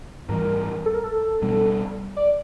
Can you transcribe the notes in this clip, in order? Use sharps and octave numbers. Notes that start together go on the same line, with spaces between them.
G#2 E3 G3 A#4
A4
A#4
A4
B2 G3 B3 D4
D5